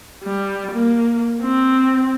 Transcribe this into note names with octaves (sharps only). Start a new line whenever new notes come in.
G3
A#3
C4